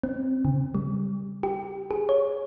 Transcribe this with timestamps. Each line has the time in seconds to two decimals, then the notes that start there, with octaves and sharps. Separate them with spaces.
0.03 C4
0.45 C#3
0.75 G3
1.43 G4
1.91 G#4
2.09 C#5